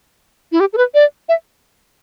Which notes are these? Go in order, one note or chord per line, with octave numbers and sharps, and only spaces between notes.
E4
G4
A4
B4
D5
E5